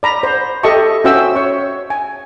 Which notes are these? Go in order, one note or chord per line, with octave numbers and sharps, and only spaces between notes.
D5 A#5 B5
C5
G4 A4 D#5 E5 A5 C#6
C#4 F#4 C5 E5 G5 E6
C#5 C#6
G#5